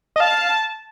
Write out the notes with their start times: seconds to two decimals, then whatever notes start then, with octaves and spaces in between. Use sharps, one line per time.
0.16 D#5
0.20 F5 A5